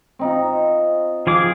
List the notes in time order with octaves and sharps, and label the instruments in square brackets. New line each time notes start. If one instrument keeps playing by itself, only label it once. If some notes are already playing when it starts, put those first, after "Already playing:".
[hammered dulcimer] C4 D#4 F4
[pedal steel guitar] F3 G#4 D6